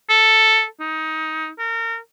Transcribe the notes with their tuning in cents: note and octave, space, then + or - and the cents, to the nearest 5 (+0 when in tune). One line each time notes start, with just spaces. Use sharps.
A4 +5
D#4 +20
A#4 -30